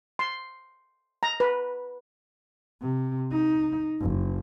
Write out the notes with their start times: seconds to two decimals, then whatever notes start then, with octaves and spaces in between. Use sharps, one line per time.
0.19 C6
1.23 A#5
1.40 B4
2.82 C3
3.31 D#4
4.00 F#1